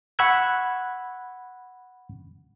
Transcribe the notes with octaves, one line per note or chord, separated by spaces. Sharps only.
F#5 B5 C#6 E6 F#6 G#6